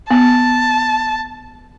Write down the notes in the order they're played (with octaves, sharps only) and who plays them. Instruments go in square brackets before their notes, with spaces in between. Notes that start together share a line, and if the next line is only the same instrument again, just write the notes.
[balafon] B3 [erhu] A5